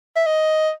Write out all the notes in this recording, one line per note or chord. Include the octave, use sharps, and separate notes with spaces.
E5
D#5